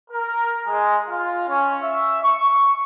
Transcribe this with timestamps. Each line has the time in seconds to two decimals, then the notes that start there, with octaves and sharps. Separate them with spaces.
0.11 A#4
0.67 G#3
1.08 F4
1.48 C#4
1.83 E5
2.23 C#6